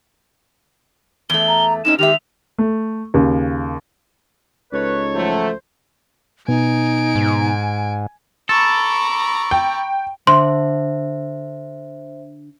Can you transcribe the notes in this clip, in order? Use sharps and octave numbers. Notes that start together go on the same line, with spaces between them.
E2 A3 G7
A#5
A2 C4 C#4 D#4 E7
D#3 G#3 G4 E5 F7
A3
D#2 C#3
C#2 D#4 A4 B4 C#5
F3 F#3 A3 C5
B2 B3 D#4 G#5 D7
G#2
A4 A#5 B5 C#6 D6
G5
D3 C5 E5 C6